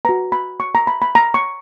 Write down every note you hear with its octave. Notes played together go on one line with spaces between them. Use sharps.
F#4 B4 A#5
B5
C#6
A#5
B5
B5
A#5
C#6